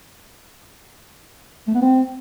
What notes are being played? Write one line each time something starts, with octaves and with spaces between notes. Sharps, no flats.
A3
B3
C4